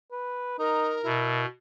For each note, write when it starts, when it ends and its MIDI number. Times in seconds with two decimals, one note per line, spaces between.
0.12 0.59 71
0.59 0.96 63
0.59 1.43 70
1.05 1.45 47
1.05 1.43 64